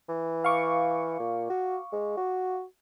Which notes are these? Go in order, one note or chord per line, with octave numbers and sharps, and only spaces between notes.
E3
F5 C#6 D6
A#2
F#4
G#3
F#4